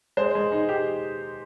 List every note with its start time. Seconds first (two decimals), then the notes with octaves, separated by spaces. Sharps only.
0.17 G#3 C5
0.35 G#3
0.52 D#4
0.69 G4